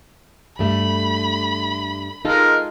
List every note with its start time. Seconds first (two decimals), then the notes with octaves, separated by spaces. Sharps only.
0.59 G2 A3 B5
2.25 G#3 D#4 F4 A4 A#4